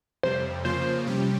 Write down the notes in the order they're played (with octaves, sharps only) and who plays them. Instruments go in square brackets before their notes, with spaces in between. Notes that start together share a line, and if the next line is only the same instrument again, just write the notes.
[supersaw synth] F2 C3 G3 [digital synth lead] C5
[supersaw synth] C#3 F3 A#3 F4 [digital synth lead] C5
[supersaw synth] C3 G3 C#4 G4